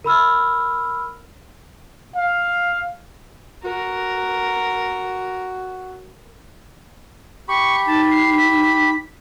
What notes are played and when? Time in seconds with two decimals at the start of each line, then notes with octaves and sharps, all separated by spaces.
0.04 A#4 B5 E6 F6
2.16 F5
3.64 F#4 A#4
7.48 G4 B5 C#6
7.87 D#4 A5
8.11 C7
8.36 B6